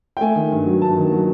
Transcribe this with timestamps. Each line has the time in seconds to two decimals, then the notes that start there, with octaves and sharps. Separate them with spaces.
0.17 G5
0.21 A3 G#5
0.36 D#3
0.52 G2
0.66 F#3
0.82 G2 A5
0.98 D#3
1.12 F#3